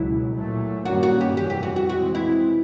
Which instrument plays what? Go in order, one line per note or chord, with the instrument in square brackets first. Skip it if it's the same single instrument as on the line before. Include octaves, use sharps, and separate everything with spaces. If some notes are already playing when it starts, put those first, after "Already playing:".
Already playing: [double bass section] C#2 B2 F#3 [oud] E4
[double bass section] A#2 F#3 A3
[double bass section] G2 D#3 G3 A#3 C#4 [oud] F#4
[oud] F#4
G4
[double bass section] F2 C3 E3 G3 [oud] G4
[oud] G4
F#4
F#4
[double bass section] C3 E3 G#3 C4 [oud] F#4
[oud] E4